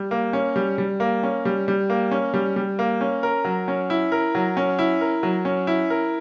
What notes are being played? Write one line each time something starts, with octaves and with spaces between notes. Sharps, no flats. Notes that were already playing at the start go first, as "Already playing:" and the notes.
Already playing: G3
A#3
C#4
G3
G3
A#3
C#4
G3
G3
A#3
C#4
G3
G3
A#3
C#4
A#4
F#3
C#4
E4
A#4
F#3
C#4
E4
A#4
F#3
C#4
E4
A#4